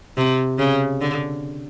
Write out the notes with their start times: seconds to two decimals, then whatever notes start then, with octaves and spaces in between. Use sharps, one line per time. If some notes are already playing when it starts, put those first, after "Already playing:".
0.17 C3
0.59 C#3
1.01 D3